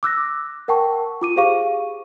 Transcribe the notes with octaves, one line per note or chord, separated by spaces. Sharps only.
D6 E6 F#6 A#6
A#4 F#5 G5 A5 C#6
F4 D6 D#7
G4 G#4 C5 F5 C#6 D#7